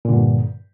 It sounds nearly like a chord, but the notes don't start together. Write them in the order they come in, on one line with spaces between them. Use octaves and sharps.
A#2 D3 G2